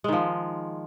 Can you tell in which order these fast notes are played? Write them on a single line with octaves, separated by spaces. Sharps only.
G#3 D#3 F3